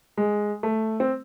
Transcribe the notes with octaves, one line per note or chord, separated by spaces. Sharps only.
G#3
A3
C4